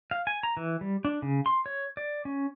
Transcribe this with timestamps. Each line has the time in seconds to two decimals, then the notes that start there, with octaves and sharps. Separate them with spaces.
0.11 F5
0.27 G#5
0.43 A#5
0.57 E3
0.81 G3
1.05 D4
1.22 C#3
1.46 C6
1.66 C#5
1.97 D5
2.25 C#4